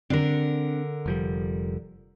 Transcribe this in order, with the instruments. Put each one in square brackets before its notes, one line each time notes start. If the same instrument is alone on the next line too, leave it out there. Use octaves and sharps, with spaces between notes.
[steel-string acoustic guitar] D3 A#4 [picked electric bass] C4 D4
[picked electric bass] F1 F3 G3